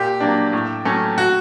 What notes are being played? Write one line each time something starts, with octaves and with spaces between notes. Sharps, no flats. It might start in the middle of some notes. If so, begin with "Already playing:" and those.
Already playing: A#2 G4
F#3 A#3 D4
A2
F#3 A3 C#4
F#4